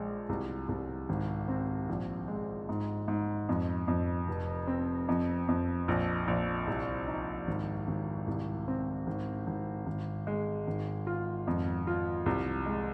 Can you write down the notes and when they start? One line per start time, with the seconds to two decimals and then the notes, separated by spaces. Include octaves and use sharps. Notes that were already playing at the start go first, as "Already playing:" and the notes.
Already playing: A#1 G#3
0.29 C2
0.69 C2
1.09 G#1
1.48 C4
1.89 A#1
2.28 G#3
2.69 G#2
3.08 G#2
3.49 F2
3.88 F2
4.28 F1
4.67 C4
5.08 F2
5.48 F2
5.88 A#1
6.28 A#1
6.67 C2
7.07 D#4
7.48 G#1
7.87 G#1
8.27 C2
8.68 C4
9.07 G#1
9.47 G#1
9.86 G#1
10.27 G#3
10.67 G#1
11.07 F4
11.47 F2
11.87 F4
12.26 C2
12.66 G#3